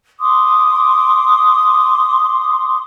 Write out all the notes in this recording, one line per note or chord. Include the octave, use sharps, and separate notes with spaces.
C6 D6 D#6